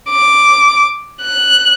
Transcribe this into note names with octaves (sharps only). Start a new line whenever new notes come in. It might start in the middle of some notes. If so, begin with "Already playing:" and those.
D6
F#6